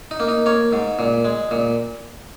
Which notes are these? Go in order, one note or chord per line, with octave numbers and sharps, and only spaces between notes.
D#4
A#3
D#4
A#3 C#5
G#2
A#2
G#3
A#2